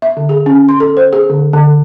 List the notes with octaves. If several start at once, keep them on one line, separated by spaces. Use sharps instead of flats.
E5
D3
G#4
C#4
C6
A4
C5
G#4
D3
D3